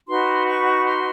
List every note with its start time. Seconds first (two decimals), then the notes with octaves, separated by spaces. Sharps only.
0.08 D#4 F#4 B4 C6
0.46 C#6
0.85 C6